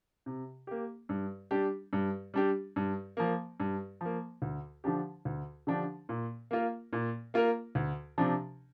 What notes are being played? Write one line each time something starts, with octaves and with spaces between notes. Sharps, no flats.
C3
A#3 G4
G2
G3 D4 G4
G2
G3 D4 G4
G2
F3 A#3
G2
F3 A#3
D2
D3 F3 D4 G4
D2
D3 F3 D4 G4
A#2
A#3 F4 A#4
A#2
A#3 F4 A#4
D2
C3 F3 D4